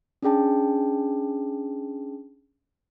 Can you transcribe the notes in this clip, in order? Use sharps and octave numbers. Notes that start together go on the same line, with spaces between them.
C#4 D4 G#4 G5 A5